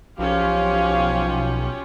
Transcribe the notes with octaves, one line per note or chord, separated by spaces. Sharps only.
B1 F3 C#4 F4 G4 F5